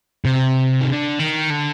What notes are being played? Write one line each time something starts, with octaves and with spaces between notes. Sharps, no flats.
C3
D#3
D3
D#3
D3